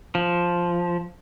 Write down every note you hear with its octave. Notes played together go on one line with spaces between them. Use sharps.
F3